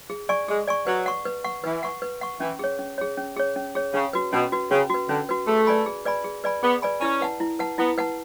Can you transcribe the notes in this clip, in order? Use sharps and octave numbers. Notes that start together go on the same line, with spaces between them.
G#4
D5 G#5 C#6
G#3 G#4
D5 G#5 C#6
F#3 B4
F#5 C#6
B4
F#5 C#6
E3 B4
F#5 C#6
B4
F#5 C#6
E3 C#4
G#4 C#5
C#4
G#4 C#5
C#4
G#4 C#5
C#4
G#4 C#5
C#3 C#4
F#4 B4
B2 C#4
F#4 B4
C#3 C#4
F#4 B4
D3 C#4
F#4 B4
A3 G#4
B4 D5 G#5 B5
G#4
B4 D5 G#5 B5
G#4
B4 D5 G#5 B5
B3 G#4
B4 D5 G#5 B5
C#4 E4
B4 F#5 A5
E4
B4 F#5 A5
B3 E4
B4 F#5 A5